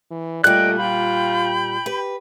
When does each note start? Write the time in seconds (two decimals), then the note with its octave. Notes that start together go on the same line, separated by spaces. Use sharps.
0.11 E3
0.44 A#2 G3 A3 D5 D#5 G5 F#6
0.79 F4 G5 B5 G6
1.86 G4 B4